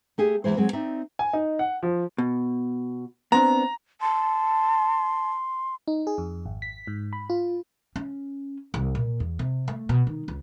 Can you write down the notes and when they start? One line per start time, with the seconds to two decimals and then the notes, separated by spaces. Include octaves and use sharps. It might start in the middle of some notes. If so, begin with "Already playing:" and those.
0.18 A3 G4 G#4
0.44 E2 A2 E3 G#3 C5
0.57 F#3 G#3 C4
0.73 C4 D#4 D5 E5
1.19 G#5
1.33 D#4
1.59 F#5
1.83 F3
2.18 B2
3.32 B3 C4 D4 A#5
4.01 A5 C6
5.88 D#4
6.07 G#4
6.18 F2
6.46 G#1
6.62 B6
6.87 G#2
7.13 B5
7.30 F4
7.96 C#4
8.74 C2
8.95 A#2
9.20 E2
9.39 C3
9.68 A3
9.89 B2
10.07 D#3
10.28 C#2